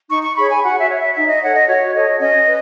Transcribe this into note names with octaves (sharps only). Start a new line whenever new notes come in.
D#4 C#6
C#6
G#4 C#5 B5
G#5
F#4 F#5
E5
C#5
E5
D#4 E5
D#5
A4 C#5 F#5
D#5
F#4 C#5
A4 C#5 D#5
C#4 D#5
B4